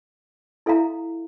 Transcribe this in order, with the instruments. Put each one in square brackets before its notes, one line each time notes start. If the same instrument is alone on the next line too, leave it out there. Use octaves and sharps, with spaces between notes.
[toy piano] E4 A4 E5 F5 A#5